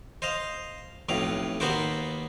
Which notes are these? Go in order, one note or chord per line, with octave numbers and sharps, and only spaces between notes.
C5 D#5 F5
B1 F2 A2 F5 D6
D#2 A#3 B3 F#4 C5 D6